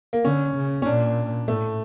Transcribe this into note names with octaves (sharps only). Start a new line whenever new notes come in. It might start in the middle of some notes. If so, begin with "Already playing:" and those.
A#3
D3 C#4
C#3
C#4
A#2 D4
A2 A3